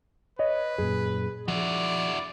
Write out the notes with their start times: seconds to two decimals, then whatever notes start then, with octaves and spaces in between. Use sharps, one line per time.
0.39 B4 C#5 D#5
0.78 F#2 A#2 G#4
1.48 F3 E4 F#4 D5